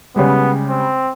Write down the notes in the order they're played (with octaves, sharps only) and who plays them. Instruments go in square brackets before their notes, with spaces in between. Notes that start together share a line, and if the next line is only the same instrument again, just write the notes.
[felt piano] C#3 G3 G#3 [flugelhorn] B3
[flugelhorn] C4